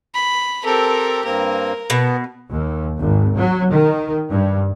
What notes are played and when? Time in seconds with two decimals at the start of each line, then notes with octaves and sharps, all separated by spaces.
0.15 B5
0.65 C4 G4 A4 A#4
1.24 G2 A#3 C4 A#4
1.90 B2 B3
2.51 D#2
2.99 G#1
3.35 F#3
3.71 D#3
4.31 G2